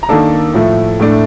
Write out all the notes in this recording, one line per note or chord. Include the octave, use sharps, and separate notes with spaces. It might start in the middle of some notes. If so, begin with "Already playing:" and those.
A#5
D#3 A#3 D4 A4 A5
A2 F3 A3
A2 A3 D4